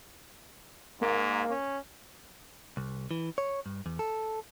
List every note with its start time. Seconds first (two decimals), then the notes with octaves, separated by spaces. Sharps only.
1.01 G#2 A#3
1.50 C#4
2.77 C2
3.11 E3
3.38 C#5
3.66 G2
3.86 E2
3.99 A4